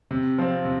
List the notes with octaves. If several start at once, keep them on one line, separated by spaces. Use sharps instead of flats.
C3
F3 C4
C3